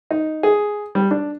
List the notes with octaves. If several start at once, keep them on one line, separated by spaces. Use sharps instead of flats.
D#4
G#4
G3
D4